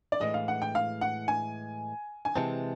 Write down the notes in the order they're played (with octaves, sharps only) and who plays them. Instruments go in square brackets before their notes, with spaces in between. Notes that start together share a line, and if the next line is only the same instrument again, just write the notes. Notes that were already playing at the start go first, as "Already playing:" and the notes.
[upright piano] D5
[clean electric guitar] A2 E3 G#3 [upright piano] D#5
[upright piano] F5
F#5
G5
F5
F#5
G#5
G#5
[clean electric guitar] C3 E3 G#3 C4 [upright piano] A5